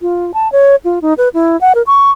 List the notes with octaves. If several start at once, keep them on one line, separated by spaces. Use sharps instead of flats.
F4
A5
C#5
F4
D#4
B4
E4
F#5
A#4
C#6